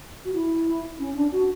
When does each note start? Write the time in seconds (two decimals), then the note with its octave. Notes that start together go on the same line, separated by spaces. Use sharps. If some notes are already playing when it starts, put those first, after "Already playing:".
0.25 F#4
0.34 E4
0.99 C#4
1.16 D4
1.32 F#4